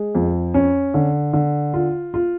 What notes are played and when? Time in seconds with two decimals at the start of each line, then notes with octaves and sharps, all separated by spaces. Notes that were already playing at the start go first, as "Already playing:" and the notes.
Already playing: G#3
0.15 F2
0.54 C#4
0.94 D3
1.33 D3
1.74 F4
2.14 F4